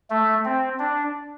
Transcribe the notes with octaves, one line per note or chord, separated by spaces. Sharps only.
A3
C4
D4